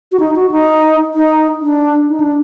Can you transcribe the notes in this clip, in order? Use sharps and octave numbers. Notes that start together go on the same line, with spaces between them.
F#4
D#4
F#4
D#4
D#4
D4
D#4
D4